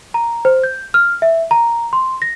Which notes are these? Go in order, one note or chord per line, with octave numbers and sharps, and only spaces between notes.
A#5
C5
G6
F6
E5
A#5
C6
A#6